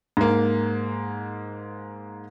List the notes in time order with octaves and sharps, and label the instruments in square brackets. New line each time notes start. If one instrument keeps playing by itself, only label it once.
[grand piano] G#2 A#3